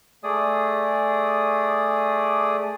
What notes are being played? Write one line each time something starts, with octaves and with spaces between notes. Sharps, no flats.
A3 G#4 D5 D#6